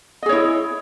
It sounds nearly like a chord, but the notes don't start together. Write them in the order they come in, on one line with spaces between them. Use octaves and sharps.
D#5 G#4 C#5 E4